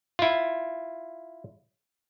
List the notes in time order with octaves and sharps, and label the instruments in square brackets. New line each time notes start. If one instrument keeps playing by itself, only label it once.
[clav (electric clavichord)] E4 F4